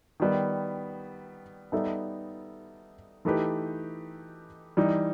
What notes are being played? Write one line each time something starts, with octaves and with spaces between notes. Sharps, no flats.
D#3 G3 B3
G3 B3 D#4 A4 E5
E3 A3 D#4 G4 B4
E3 G3 D#4